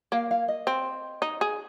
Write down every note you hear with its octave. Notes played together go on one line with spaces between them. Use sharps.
A#3 F5
F5
D#5
C4
D#4
G#4